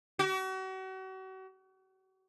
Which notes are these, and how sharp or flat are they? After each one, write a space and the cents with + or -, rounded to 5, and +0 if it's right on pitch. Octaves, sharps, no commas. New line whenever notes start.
F#4 +40